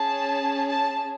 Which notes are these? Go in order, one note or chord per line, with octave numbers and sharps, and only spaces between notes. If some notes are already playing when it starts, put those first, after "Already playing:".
Already playing: C#4 G#4 A5
A5